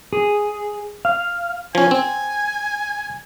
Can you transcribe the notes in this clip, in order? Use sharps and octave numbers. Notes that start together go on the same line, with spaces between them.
G#4
F5
F3 C#4 G#5
C4